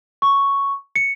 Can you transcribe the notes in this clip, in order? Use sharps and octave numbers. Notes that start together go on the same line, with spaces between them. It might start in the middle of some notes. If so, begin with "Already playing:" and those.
C#6
C#7